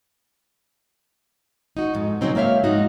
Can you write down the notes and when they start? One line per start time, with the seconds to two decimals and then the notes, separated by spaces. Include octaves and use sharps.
1.77 D#4 F#4
1.94 F2 G#2
2.21 C#3 F3 F#3 C4 D#4
2.35 G#3 A#3 C#5 E5 F5
2.64 G#2 F3 D#4 F#4